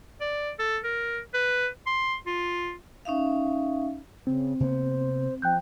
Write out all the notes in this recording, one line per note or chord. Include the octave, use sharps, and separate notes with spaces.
D5
A4
A#4
B4
C6
F4
C#4 D#4 E5 F5
C#3 C4
C3 A#3 B3 C5
F3 G5 F#6 G6